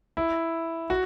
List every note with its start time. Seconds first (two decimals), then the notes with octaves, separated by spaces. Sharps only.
0.17 E4
0.90 F#4